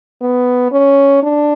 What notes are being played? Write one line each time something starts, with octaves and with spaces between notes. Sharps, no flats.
B3
C#4
D4